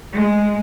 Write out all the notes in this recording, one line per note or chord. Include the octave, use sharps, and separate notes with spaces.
G#3